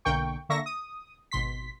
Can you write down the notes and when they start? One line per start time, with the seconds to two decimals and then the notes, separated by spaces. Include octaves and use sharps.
0.05 B1 D3 A#3 G5 C#6
0.49 D3 A#3 E5 C#6 A#6
0.66 D#6
1.31 G#1 B2 C6 B6